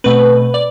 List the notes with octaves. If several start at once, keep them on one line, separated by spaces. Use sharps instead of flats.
B2 A3 C4 B4
D5